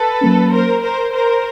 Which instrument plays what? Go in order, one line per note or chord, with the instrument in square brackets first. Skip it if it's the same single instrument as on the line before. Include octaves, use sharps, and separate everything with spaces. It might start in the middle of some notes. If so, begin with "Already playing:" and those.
Already playing: [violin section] A4 B4
[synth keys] F#3 A#3 C#4
[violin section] A#4 C5
A#4 C5
A#4 C5